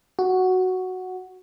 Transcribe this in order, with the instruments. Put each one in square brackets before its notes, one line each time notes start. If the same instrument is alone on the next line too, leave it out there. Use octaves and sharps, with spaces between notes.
[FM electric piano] F#4